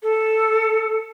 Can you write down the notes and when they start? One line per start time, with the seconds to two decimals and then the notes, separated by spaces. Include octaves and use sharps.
0.03 A4